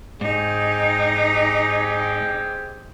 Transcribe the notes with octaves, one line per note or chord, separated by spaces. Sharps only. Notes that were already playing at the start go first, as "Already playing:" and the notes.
G#2 C4 D#4 G4 G#4